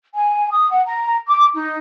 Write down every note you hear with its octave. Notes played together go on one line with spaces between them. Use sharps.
G#5
D#6
F#5
A#5
D6
D#4